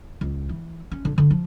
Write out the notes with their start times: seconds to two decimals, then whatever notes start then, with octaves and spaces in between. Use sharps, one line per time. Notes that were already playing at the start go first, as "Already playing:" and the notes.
0.21 C#2
0.49 E3
0.92 C#4
1.05 D3
1.18 D3
1.30 F3